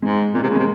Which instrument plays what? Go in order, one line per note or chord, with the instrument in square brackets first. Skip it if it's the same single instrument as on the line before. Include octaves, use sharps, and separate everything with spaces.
[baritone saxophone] G#2 [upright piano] G#3
[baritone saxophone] A#2 [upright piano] G#3
[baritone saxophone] C3 [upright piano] A#3
[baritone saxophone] C#3
[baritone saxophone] C3 [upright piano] G#3